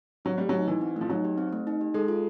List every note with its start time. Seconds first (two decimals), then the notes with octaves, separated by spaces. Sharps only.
0.25 F#3 C4
0.38 G3 A3
0.49 F#3 D#4
0.68 E3 G4
0.81 C4
0.96 F3 A3
1.09 F#3 D#4
1.25 G4
1.38 C4
1.53 A3
1.67 D#4
1.81 G4
1.94 G#3 A4
2.08 F4